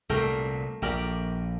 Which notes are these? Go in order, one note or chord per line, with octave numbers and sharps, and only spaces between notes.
C2 A#2 A3 A#4 G5
A#1 G4 A#4 D5